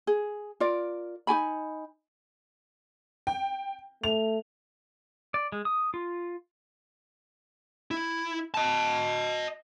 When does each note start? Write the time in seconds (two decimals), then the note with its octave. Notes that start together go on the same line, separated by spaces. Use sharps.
0.07 G#4
0.60 F4 A#4 D5
1.27 D#4 G4 G#5 B5
3.27 G5
4.04 A3 F7
5.34 D5
5.52 G#3
5.65 D#6
5.94 F4
7.91 E4
8.54 D#5 A5